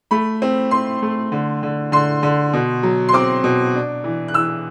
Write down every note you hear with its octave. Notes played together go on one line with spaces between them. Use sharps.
A3 B5
C4
C4 C6
A3
D3
D3
D3 C6
D3
B2
F#3
C6
C4 D6
B2
D4
E3
F#6
E3 E6